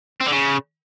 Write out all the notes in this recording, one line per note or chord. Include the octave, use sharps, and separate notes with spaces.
C4
D3
C#3